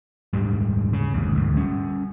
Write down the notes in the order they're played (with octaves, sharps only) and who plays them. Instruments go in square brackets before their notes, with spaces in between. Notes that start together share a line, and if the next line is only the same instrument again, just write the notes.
[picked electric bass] D#1 G#2 G3
C#3
G1 D#2 G#2
G1 D2 G#2
G3 C#4